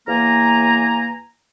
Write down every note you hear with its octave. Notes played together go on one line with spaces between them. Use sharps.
E2 A#3 G#5 A#5